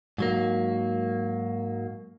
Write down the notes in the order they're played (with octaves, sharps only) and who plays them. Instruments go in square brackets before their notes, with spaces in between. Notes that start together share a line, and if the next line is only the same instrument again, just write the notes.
[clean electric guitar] G#2 F#3 A#3